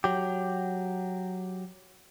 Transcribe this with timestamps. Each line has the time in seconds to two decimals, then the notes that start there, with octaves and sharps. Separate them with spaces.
0.04 F#3 G4